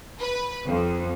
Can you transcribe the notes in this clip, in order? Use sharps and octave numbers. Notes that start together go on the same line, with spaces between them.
B4
F2